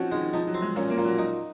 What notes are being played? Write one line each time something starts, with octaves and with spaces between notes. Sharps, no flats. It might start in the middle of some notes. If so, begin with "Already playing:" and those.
Already playing: F3 C4 C#4 D#4 F#4
D#3 G#3
F3 D#4
F#3
C4
G#3
A#2 C#4
A#3
A#2
F#3
D#4